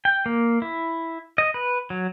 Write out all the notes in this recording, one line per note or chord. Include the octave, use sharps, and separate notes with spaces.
G5
A#3
E4
D#5
B4
F#3